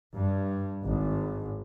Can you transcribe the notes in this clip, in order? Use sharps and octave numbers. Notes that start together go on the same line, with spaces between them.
G2
G#1